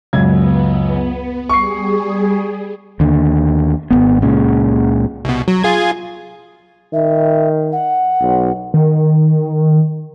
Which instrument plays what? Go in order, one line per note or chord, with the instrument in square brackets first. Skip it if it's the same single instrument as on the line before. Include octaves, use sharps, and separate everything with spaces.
[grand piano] C#2 F#2 G#6 [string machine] B3
[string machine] G3 G#4 [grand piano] C#6 C7
[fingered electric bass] D#2 D3
G#1 E2 B3
C#2 A#2 C#3
[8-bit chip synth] C2 B2
F#3
F4 G#4 G#6
[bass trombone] D#3 [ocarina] E5
[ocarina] F#5
[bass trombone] B1
[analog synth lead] D#3